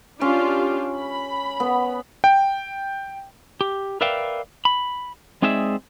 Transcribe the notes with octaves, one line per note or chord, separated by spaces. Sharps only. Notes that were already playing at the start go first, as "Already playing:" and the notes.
C#4 D4 F4 G4
B5
B3
G5
G4
A#4 B4 D5 E5 F5 G5
B5
G#3 C4 D#4 G#4 D5 E5